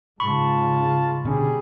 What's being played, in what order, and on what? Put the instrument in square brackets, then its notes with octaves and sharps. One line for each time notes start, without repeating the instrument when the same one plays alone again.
[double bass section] G#2 C#3 G#3 [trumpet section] F4 A5 [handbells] B5 C#6
[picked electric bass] B2 D3 C#4 [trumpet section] G3 G#4